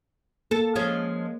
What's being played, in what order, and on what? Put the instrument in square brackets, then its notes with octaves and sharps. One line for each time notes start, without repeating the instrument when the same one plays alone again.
[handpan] A#3 [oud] A4
[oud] F3 G#3 C#4